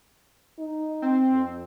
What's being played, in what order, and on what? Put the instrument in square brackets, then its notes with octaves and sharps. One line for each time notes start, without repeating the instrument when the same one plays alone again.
[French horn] D#4
[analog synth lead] C4
[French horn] F2